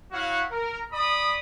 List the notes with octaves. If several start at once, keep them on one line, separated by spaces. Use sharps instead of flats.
E4 F#4 C#5 F5 F#5
A#4
D5 B5 D#6